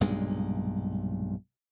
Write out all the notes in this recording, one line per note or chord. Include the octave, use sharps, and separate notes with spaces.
B1 G2 A#2 G#3